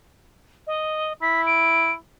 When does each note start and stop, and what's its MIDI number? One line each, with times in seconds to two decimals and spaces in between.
0.67 1.13 75
1.22 1.94 64
1.22 1.41 95
1.46 1.91 98